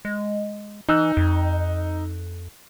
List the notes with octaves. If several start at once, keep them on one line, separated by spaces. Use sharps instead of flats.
G#3
E3 D#4 E6 F#6
F2